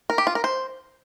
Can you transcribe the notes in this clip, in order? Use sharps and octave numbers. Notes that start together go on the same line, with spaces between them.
A#4
G4
F4
A#4
C5